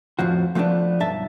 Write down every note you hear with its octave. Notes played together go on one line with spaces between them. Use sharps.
F2 A2 F3 F#4
F3 A3 B3 C#4 D4
B1 G2 E5 A5